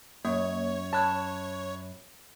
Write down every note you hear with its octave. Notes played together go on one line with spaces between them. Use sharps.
F#2 A#3 C#5
A5 B5 F#6 G#6